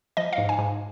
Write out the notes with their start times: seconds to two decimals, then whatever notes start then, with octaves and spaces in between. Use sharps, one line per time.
0.17 F3 D#5
0.33 F5
0.38 G#2
0.49 G#5
0.59 G#2